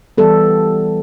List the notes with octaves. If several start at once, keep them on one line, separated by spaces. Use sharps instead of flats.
E3 G3 B3 A4